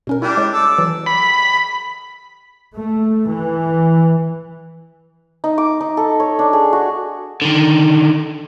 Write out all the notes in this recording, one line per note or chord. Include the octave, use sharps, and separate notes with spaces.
B2 C#4 A#4
G3 D4 E4 G5
G#3 C#5
A4 D5
E3 F#3
B5
A3
E3
D#4
D6
D#4
A4
C#5
D4
G#4
F#4
D3 D#3